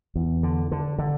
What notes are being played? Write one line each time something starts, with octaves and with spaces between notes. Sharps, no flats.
E2
D3
D3
D3